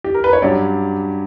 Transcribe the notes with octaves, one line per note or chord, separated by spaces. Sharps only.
G4
A#4
B4
C#5
G2 F#3 C#4 G4 D5